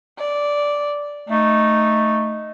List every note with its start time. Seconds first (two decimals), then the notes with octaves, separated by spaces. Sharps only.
0.18 D5
1.29 A3 D#4